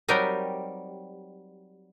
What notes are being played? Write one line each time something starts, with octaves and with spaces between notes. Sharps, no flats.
F#3 G3 C4 D#4 G4 A#4